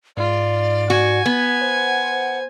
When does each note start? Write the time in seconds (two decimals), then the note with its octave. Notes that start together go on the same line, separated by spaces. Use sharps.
0.17 G#2 F4 D5
0.90 F#4 G#5
1.26 B3 G#6
1.61 C5 F#5